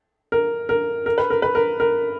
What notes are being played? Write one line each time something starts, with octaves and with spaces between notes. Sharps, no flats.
A#4
A#4
A#4
B4
A#4
B4
A#4
A#4